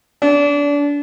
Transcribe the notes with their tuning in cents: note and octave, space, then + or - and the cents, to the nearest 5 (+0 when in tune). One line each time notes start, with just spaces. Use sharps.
D4 -30